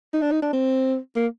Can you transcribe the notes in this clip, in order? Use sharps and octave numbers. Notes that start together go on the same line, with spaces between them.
D#4
D4
D#4
D4
C4
A#3